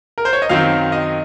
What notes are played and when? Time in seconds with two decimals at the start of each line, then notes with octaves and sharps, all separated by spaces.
0.18 A#4
0.25 C5
0.33 C#5
0.42 D#5
0.49 F#2 D#3 F#3 C4 F5
0.92 D#5